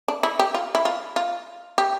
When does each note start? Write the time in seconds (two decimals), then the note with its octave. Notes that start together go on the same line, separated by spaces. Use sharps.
0.08 D4
0.23 E4
0.39 G4
0.54 F4
0.75 E4
0.85 F4
1.16 F4
1.78 G4